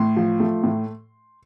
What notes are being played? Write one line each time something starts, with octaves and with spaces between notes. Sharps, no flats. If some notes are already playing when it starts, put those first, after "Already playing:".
Already playing: A2 C6
F3
A3
A2